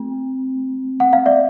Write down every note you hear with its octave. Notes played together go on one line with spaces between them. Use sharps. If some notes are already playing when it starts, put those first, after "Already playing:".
Already playing: A3 C4
F#5
F5
D5 E5